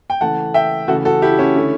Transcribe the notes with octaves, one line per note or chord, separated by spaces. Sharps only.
G5
C#3 E3 A3 F#5 A5
E5 G5
C#3 E3 A3 F#4 A4
F#4 A4
E4 G4
C#4 E4
D3 A3